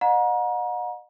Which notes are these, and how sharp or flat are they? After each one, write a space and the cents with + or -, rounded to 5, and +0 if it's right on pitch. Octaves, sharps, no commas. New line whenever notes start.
D#5 -35 F#5 -40 A#5 +30